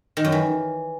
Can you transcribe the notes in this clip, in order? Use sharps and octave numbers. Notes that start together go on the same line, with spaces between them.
D#3
F#2
E3